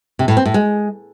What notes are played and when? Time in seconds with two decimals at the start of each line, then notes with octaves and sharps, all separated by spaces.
0.19 C3
0.28 A2
0.37 C4
0.46 A2
0.54 G#3